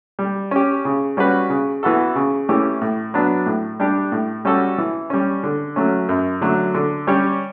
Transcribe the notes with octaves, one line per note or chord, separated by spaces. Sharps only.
G3
C#4 G4
C#3
G3 C#4 F#4 B4
C#3
E3 B3 F#4 A4
C#3
E3 A3 C#4 G4
A2
F#3 B3 D4
A2
G3 D4 G4
A2
G3 C#4 F#4 A4
E3
G3 C#4
D3
F#3 A3 C#4
F#2
D3 F#3 A3
D3
G3 C#4 G4 C#5